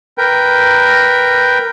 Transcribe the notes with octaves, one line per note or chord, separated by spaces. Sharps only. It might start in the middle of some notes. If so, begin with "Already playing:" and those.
A#4 B4 G5